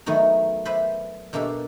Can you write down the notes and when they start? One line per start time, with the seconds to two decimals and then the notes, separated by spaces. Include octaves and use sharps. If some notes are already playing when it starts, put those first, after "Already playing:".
0.06 D#3 F#3 A3 B3 D#4
0.65 B4 C5 D5 E5 A5 B5
1.33 B2 A#3 D4 G4 A4